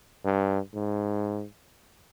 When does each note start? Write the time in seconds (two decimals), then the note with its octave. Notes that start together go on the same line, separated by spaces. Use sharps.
0.24 G2
0.74 G#2